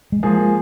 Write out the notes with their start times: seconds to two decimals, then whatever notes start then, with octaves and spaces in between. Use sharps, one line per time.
0.12 G#3
0.23 F3 A#3 G#4